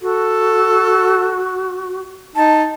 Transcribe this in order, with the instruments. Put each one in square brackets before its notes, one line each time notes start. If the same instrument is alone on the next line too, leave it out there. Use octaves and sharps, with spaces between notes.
[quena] F#4 [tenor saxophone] A4
[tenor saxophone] D#4 [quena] A5